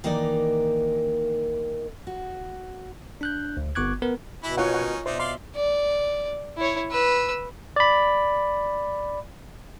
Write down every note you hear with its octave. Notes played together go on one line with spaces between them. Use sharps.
D#3 E3 A#3 D#4 A#4 D5
F#4
D4 F#6 G6
D2
G1 B3 C#6 D6 F#6 G#6
B3 A#4 B4
B2 E3 E4 B5
C#4 D#4 F4 A#4 C#5 F#5
F#5
B2 D4 D#4 C5 E5 C6
D5 F5 C6
D5
E4 C#5
B4 E6
D5 B5